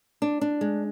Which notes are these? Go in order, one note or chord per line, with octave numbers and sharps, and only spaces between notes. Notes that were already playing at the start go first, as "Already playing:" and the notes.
D4
D4
G#3